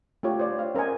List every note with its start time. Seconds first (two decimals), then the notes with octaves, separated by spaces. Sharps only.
0.23 A3 D4 F4 G4 C#5
0.39 C5 D5
0.59 F5
0.75 C#4 A#4 C5 D#5 G#5